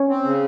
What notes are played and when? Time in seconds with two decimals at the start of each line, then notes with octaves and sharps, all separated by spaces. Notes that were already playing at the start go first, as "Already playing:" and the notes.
Already playing: C#4 C#5
0.09 C4
0.24 C#3